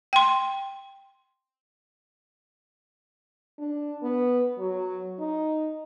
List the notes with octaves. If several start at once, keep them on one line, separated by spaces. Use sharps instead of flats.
G5 C6
D4
B3
F#3
D#4